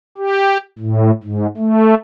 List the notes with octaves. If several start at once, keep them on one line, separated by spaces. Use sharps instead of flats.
G4
A2
G#2
A3